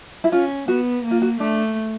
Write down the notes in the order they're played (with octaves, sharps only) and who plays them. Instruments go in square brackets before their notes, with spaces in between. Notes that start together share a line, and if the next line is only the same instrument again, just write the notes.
[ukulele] E4
[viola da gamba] C#4 [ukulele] F4
[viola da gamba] B3 [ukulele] F#4
[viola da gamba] A#3
[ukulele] F4
F#4
[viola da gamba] A3 [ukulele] D4